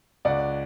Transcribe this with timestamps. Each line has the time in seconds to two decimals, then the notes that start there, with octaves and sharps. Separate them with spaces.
0.25 C#2 D5 F#5